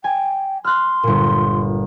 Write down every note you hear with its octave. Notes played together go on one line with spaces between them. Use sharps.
G5 G#5
C6 F6 F#6
G1 A#2